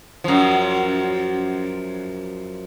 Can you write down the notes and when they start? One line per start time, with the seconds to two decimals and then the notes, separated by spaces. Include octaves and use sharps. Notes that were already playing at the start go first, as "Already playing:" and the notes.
0.24 F#2 F3